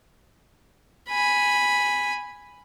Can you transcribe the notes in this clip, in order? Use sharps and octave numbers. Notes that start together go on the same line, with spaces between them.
G#5 B5